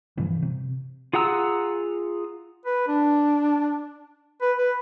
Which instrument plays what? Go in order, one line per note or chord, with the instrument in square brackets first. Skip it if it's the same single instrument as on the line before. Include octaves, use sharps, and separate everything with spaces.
[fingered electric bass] G2 C3 E3 F3
C3
[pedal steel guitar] F4 G#4 F#5 A#5 E6
[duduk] B4
D4
B4
B4